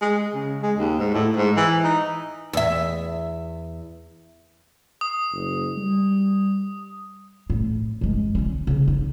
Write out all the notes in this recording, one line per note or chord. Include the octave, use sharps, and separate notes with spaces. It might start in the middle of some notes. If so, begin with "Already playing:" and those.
G#3
C#3
G#3
D#2
G#2
A2
G#2
E3
D#4
E2 E5
D#6
F#1
G3
A2
F#2 G#3
D3 C#4
C#3 B3
D#4